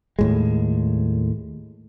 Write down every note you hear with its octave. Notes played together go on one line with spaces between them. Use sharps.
D#2 A2 G#3